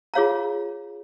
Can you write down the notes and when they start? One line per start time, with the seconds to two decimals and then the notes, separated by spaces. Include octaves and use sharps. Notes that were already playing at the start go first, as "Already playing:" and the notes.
0.14 F4 G#4 C#5 F5 A#5